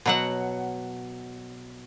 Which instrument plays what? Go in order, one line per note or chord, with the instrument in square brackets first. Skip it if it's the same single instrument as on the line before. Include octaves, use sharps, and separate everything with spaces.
[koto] B2 F#3 F#5